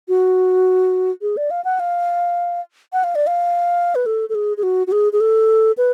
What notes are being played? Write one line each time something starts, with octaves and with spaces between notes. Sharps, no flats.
F#4
G#4
D5
F5
F#5
F5
F#5
F5
D5
F5
B4
A4
A4
G#4
G#4
F#4
F#4
G#4
G#4
A4
B4